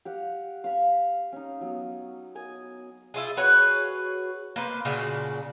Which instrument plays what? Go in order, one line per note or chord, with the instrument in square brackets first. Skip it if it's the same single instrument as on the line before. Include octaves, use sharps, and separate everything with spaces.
[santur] G4 F5 F#5
F5 B5 C#6
C#4 D#4
F#3 B3
D#5 G#5 D#6
[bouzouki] E4 F4 G#4
F#4 G#4 B4 C#5
A#3 B4 C5
A#2 C#3 D4 F#4